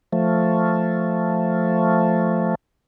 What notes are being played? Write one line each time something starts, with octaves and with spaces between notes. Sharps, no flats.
F3 A3